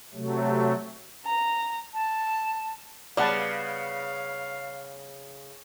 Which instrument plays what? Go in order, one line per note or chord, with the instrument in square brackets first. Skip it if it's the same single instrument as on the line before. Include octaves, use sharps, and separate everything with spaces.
[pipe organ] C3 F#3 A3
[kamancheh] A#5
[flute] A5
[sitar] C#3 [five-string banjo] G3 B3 [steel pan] D5 F#5 A5 [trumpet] F5